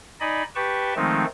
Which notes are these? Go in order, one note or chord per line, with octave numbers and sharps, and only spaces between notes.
D#4 D5 D#5 G#5 B5
G4 B4 G5 A5 C#6
D#3 F3 G#3 A3 C4 D#4